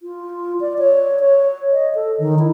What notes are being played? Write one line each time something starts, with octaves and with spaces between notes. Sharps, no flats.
F4
D5
C#5
C#5
D#5
A4
D#3
E4